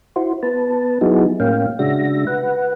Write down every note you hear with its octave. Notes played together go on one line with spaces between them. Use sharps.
E4 F#4 C5
B3 B4 A5
F#3 B3 D#4 E4 F#4 G#4
A2 A#3 C#4 F5 G5
C#3 G#3 D4 F#4 E5 A#6
B4 F#5